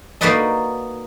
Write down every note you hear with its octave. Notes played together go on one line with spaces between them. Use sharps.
A#3 D#4 F#4 B4 D5 D#5